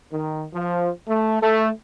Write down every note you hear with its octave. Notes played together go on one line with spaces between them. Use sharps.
D#3
F3
A3
A3